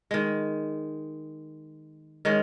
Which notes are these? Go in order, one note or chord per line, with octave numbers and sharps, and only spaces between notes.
D#3 G#3
D#3 G#3 C#4